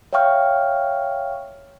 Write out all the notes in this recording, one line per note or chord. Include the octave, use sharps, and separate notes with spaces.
C#5 E5 F5 G5 C#6 F6